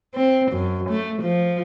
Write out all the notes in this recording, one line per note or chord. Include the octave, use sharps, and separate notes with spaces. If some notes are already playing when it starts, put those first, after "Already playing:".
C4
F#2
A3
F3